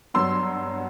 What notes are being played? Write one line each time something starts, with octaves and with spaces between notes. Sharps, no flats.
G2 F#3 B3 C6 E6